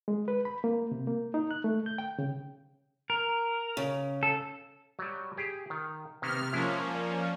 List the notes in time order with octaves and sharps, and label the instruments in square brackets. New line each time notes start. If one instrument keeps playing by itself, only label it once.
[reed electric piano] G#3
B4
B5
A#3
C3
A#3
D#4
F#6
A3
G6
G5
C#3
[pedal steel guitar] A#4
[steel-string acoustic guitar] C#3
[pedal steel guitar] A4
[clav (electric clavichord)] F#3 G3
G4 G#4
D#3
[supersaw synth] C3 F6 [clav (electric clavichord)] D#3 A#3 B3
[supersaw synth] F3 A#3 C#4 [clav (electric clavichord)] G#3 E4
[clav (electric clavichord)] D5